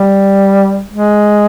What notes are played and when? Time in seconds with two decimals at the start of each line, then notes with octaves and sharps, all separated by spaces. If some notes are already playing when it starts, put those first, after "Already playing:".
Already playing: G3
0.91 G#3